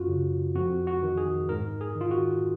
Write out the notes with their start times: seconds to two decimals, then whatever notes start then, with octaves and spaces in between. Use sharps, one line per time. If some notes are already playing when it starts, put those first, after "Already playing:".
Already playing: F#2 F4 F#4
0.08 C#3
0.55 F2 F#4
0.87 F#4
1.03 D#3
1.17 G#4
1.49 G#2 A#4
1.81 G#4
1.96 D#3
2.01 F4
2.11 F#4